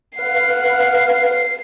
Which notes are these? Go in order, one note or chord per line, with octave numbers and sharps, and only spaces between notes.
B4 F5 F#5 C7